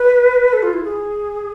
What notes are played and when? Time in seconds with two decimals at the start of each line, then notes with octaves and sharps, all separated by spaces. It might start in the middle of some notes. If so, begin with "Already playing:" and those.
Already playing: B4
0.53 A4
0.62 F4
0.73 E4
0.83 G#4